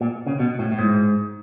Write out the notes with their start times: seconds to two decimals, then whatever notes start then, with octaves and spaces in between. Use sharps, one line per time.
0.01 A#2
0.26 C#3
0.40 B2
0.59 A2
0.72 A2
0.79 G#2